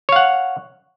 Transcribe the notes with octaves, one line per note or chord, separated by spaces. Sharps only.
C#5 F5 F#5